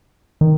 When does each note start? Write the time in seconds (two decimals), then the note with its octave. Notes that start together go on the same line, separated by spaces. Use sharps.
0.41 D#3